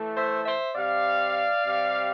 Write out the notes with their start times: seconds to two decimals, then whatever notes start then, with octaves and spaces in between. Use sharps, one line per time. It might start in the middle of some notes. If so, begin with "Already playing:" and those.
Already playing: A2 E3 A3
0.15 C5 E5
0.45 C5 E5
0.75 C3 G3 D5 F5
1.65 C3 G3